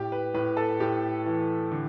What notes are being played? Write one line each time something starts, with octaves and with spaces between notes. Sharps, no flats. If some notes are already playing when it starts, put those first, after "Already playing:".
Already playing: A2 G4
B4
A2 B4
A4
A2 G4
E3
D3